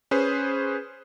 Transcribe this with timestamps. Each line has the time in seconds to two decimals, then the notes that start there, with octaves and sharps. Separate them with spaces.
0.11 C#4 G#4 B4 C5